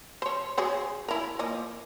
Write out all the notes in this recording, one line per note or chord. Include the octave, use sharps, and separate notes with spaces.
C5 C#5
F#3 G#4 C5
E4 A#4
F3 A#3 D#5